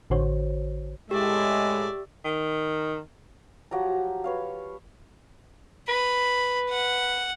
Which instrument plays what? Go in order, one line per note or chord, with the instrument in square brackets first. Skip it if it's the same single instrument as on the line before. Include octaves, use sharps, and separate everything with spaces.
[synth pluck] A1 D3 F#4 C5 C#5
[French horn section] A2 G#3 [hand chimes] G4 [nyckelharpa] D5 E5
[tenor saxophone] D#3
[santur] F3 F#3 G4 A#5
B4 C#5 F5
[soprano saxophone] B4 [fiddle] B5
[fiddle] F#5